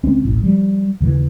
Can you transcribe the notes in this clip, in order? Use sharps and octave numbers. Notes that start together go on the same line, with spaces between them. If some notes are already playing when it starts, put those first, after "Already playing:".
C#2 C4 C#4
D#1 A1
F3 G3
D#2 C#3 E3